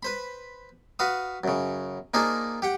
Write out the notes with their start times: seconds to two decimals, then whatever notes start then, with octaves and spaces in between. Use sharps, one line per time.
0.03 B4 C5 B5
0.99 F#4 B4 F5 D#6
1.44 F#2 C#3
2.14 A#3 D4 D#4 F4 G#4 C5
2.62 G4 F#5 G5